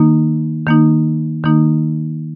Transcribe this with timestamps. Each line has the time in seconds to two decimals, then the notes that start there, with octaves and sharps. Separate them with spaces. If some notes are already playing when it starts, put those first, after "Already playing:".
Already playing: D#3 A#3 D#4
0.67 D#3 A#3 D#4
1.44 D#3 A#3 D#4